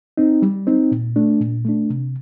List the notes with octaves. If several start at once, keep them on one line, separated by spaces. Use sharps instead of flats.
C4 D#4
G3
C4 D#4
A#2
A3 D4
A#2
A3 D4
C3